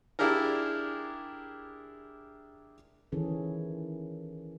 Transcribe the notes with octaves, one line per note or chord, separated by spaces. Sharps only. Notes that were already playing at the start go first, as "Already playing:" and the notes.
D4 E4 G4 G#4 A#4
D#3 E3 C#4 G#4 A4